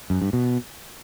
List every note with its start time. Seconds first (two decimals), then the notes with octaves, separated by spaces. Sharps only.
0.10 F#2
0.22 G2
0.33 B2